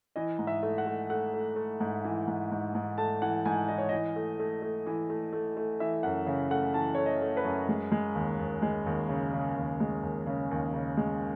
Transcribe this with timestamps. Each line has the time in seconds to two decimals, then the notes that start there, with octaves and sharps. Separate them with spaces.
0.16 E3 D#5
0.39 G#2
0.47 E5
0.63 A3
0.78 F#5
0.87 A3
1.10 A3 F#5
1.34 A3
1.56 A3
1.80 G#2
2.04 E3
2.27 G#2
2.51 G#2
2.75 G#2
2.98 A3 A5
3.22 E3 F#5
3.45 G#2 G#5
3.68 E3 D#5
3.78 C#5
3.89 E3 D#5
4.16 A3
4.39 A3
4.62 A3
4.86 E3
5.10 A3
5.33 A3
5.57 A3
5.80 E3 E5
6.03 F#2 F#5
6.27 C#3
6.51 A3 F#5
6.74 E3 A5
6.95 A3 C#5
7.06 D#5
7.22 A3
7.37 B4
7.45 F#2
7.69 G#3
7.92 G#3
8.15 D#2
8.39 D#2
8.62 G#3
8.86 D#2
9.09 C#3
9.33 C#3
9.56 D#2
9.80 G#3
10.03 D#2
10.26 C#3
10.51 D#2
10.73 C#3
10.97 G#3